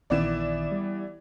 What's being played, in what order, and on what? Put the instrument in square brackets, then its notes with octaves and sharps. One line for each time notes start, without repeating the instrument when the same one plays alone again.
[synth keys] A#1 D#3 E7 [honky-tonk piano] E3 B3 D5
[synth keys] G3